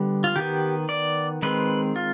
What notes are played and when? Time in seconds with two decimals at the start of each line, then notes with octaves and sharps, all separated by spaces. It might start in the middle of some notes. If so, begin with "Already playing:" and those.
Already playing: D3 G3 B3
0.24 F4
0.36 D#3 B3 G4
0.89 D5
1.42 D#3 G#3 C4 B4
1.96 F4